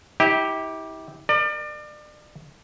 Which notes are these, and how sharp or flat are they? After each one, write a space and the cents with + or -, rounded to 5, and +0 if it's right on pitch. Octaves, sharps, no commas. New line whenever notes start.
E4 -40 G4 +0
A#4 +0 D5 +35